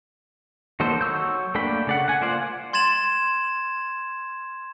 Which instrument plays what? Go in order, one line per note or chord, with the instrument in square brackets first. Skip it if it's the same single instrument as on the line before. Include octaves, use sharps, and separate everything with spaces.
[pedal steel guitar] D#3 F#3 A#3 A4 C5
F#3 C#6 E6 G6
A3 A#3 D4 G5 B5
C#3 D5 F#5
F#5 G#5
A#3 F4 C5 D5 F#5
[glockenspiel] C6 G#6 A6 E7 F#7